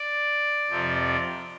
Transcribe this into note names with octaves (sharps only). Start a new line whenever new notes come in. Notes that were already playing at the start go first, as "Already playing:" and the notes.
Already playing: D5
F2 C3 F3